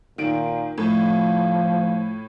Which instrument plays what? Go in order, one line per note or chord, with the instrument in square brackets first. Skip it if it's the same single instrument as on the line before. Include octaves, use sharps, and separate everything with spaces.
[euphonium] A#2 [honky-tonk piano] D#3 D7
[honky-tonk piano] A2 [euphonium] F3